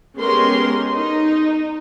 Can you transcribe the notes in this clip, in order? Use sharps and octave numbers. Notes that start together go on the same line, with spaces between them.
G#3 B3 C#4 G4 A#4 C6
D#4